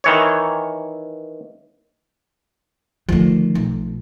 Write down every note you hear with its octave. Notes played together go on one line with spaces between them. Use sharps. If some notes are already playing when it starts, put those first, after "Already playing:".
D#3 E3 C#5
D3 D#3 F3 A3
B1